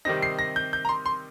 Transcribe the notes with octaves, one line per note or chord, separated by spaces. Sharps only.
C3 D#3 G3 C4 D#4 A#6
C7
A#6
G6
G6
A#5
C6
C6